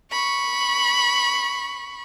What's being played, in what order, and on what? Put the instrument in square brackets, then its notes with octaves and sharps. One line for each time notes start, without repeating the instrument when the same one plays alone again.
[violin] B5 C#6